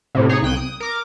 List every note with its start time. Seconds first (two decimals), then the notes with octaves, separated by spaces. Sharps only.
0.15 A2 C3
0.29 D#4 G#4 C#5
0.42 C2 G5 F#6 D#7
0.57 D#6
0.80 A#4 D6